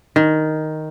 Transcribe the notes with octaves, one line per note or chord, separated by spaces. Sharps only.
D#3